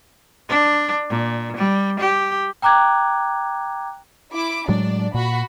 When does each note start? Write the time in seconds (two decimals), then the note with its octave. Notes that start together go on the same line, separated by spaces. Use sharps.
0.49 D4
1.10 A#2
1.57 G3
2.00 G4
2.62 G5 A#5 D6 F#6 G#6
4.32 E4 D6
4.68 A2 F#3 G#3 D4 D5
5.14 A#2 F#4 B5